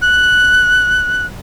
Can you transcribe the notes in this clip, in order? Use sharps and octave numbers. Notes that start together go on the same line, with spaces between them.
F#6